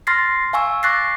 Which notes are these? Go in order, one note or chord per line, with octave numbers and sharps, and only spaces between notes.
C6 F6 A6 A#6 C7
F5 G#5 C#6 E6
C#6 D6 F#6 A6 A#6 C7